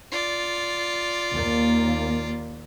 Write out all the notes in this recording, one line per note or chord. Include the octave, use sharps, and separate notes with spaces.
F4 D5
D#2 A#3